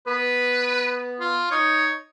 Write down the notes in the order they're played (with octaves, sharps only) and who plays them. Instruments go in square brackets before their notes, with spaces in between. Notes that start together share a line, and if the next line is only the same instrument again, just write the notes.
[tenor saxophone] B3 [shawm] B4
[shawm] F4
[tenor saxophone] D#4 [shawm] C#5